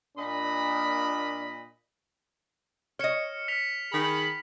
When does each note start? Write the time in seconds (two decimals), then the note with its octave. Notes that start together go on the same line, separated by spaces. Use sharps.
0.17 A#2 D4 D#5 B5
2.99 C#5 D#5 F6 C#7 E7
3.48 F6 B6 F7
3.92 D#3 G#4 B5